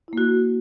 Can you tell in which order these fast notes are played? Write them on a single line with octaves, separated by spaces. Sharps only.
E4 A#3 F#4